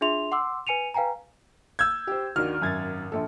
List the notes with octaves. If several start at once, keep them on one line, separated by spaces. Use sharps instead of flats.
D4 F4 G#4 E5 C6 F7
F#5 C6 D6 E6
B4 G#5 C#7 D#7 F7
B4 F5 G5 G#5 A#5
E6 G6 G#6
G4 C5
D#2 D#3 D4 F#4 F6
G#1 F#2 G#6 A6
A#1 A4